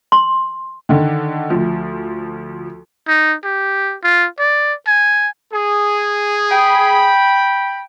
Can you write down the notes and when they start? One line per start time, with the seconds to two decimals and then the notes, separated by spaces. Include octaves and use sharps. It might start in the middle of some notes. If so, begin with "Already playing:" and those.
0.12 C6
0.89 D3 D#3
1.50 D2 F3
3.08 D#4
3.44 G4
4.03 F4
4.39 D5
4.87 G#5
5.52 G#4
6.52 G5 B5